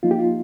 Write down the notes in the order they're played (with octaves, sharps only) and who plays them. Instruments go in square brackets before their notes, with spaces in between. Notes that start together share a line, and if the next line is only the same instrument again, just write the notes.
[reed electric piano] F3 A#3 D#4 F4
G4
F4